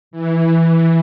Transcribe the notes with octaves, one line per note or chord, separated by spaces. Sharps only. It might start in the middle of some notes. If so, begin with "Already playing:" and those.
E3